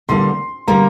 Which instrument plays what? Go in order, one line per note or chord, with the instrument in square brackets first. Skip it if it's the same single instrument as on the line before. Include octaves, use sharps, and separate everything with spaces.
[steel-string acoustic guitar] E2 D3 G3 A#3 [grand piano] C6
[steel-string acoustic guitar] D3 G3 A#3 [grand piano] A#5